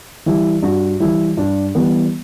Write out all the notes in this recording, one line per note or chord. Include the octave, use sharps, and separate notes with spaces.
E3 G3 E4
G2 F#4
E3 G3 E4
G2 D4
E3 G3 B3